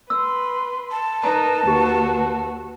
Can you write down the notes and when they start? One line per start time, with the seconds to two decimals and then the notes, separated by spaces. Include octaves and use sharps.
0.10 B4 C6 E6
0.91 A5
1.24 D#4 A#4 B4 A#5
1.67 D#2 F#4 G4